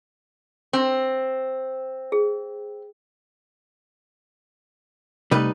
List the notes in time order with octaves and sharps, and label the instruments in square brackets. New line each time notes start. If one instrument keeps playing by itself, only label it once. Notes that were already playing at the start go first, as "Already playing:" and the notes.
[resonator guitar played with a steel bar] C4
[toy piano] G#4
[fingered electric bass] C3 A3 [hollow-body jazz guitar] G3 D#4 B4